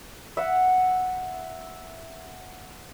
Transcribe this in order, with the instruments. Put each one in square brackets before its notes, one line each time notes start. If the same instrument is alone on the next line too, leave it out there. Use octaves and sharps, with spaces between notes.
[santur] E5 F#5